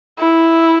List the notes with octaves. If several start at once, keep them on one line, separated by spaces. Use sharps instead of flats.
E4